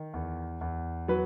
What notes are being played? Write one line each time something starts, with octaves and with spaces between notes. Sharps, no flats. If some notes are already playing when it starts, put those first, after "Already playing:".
Already playing: D#3
E2
E2
F#3 B4